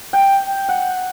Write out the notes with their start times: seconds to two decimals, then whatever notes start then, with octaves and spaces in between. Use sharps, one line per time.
0.13 G5
0.69 F#5